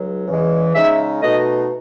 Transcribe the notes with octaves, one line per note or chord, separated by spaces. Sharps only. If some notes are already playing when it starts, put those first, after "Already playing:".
Already playing: C#2 F#3
E2 C#3 E3 G#3
C#3 G#3 D#4 E5
B2 A3 D#4 D#5